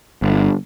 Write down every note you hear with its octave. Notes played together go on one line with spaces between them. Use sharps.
G1